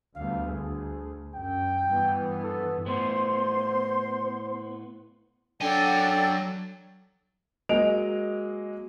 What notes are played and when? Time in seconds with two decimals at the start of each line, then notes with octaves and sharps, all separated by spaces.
0.15 D2 G3 B3 F5
0.47 D2 G#4
1.35 F#2 G5
1.85 G2 E3 B3
2.43 A4
2.86 A2 B3 C5 C6
5.61 F#3 D4 A4 G5 G#5
7.69 F#3 G#3 A#3 D#5 D7 F7